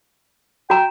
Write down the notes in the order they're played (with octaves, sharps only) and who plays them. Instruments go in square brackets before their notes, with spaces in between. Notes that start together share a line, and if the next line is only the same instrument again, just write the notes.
[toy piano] F#4 A#5 [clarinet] G5